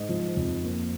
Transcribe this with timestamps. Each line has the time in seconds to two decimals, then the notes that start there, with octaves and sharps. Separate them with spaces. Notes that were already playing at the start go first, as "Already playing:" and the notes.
Already playing: G#2 D#5
0.09 F3
0.37 F2
0.63 A#3